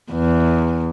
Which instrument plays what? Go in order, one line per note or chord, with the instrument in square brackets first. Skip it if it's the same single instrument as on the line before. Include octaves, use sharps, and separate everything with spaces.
[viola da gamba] E2